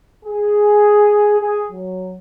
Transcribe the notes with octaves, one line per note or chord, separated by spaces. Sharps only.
G#4
G#4
F#3